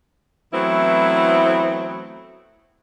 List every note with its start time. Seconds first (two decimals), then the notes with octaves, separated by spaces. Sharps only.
0.54 E3 F#3 A3 B3 C4 E4